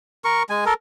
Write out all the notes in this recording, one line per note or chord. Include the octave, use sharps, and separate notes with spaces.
A#4 C#6
G#3 G#5
A4 A#4